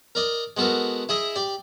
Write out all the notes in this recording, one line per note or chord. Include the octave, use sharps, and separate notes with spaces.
A#4 D5 D#5
G#3 B3 F#4 A4 A#4
E4 G#4 D#5 E5
G4 D5